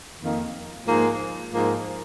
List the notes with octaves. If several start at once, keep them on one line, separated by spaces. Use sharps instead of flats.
F2 D#3 A#3
G#2 F3 A#3
G#2 F3 A#3